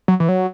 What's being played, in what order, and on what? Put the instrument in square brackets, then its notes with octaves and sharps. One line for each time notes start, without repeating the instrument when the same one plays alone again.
[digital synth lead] F#3
E3
F#3